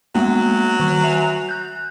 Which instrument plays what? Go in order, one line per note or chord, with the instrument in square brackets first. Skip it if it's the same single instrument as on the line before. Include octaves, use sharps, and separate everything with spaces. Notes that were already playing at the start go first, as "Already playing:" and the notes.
[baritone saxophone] F#3 [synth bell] G#3 A#3 B3
[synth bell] D#3 C#6
E5 G#5 F7
F#6 G6